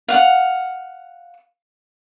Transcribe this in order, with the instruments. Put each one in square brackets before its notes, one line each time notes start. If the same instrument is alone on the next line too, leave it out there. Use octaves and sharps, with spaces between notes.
[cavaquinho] F5 F#5